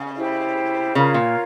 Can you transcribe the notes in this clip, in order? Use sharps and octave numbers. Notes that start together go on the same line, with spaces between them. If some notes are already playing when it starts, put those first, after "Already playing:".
Already playing: C#3
E4 G4 C5
C#3 F4 A#4 C#5 F5
A#2